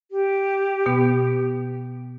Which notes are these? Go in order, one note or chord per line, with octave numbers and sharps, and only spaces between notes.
G4
B2 B3